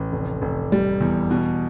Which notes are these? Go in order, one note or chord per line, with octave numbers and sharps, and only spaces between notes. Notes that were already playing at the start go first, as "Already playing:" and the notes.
Already playing: A1
F1
F1
G3
E2
B2